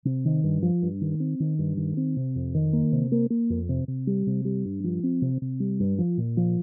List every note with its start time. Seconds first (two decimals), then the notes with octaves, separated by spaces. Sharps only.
0.05 C3
0.25 D#3
0.44 G2
0.62 F3
0.82 G2
1.01 D#3
1.20 C4
1.40 D#3
1.59 G2
1.77 D#3
1.97 C4
2.17 C3
2.36 F2
2.54 D#3
2.73 A#3
2.92 C3
3.12 A#3
3.30 A#3
3.50 F2
3.69 C3
3.88 C3
4.07 G3
4.27 C3
4.45 G3
4.65 G2
4.84 F3
5.03 C4
5.22 C3
5.42 C3
5.60 G3
5.80 G2
5.98 F3
6.18 A#2
6.37 F3